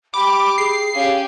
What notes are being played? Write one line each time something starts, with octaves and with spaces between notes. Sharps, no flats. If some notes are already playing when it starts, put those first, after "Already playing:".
G4 B5 D6
G#4 C7
C#4 G4 F5